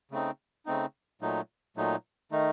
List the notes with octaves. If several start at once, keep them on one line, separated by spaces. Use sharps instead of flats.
C#3 A3 C4 D#4
C#3 A3 C4 D#4
A#2 F#3 A3 D#4
A#2 F#3 A3 D#4
D#3 A3 D#4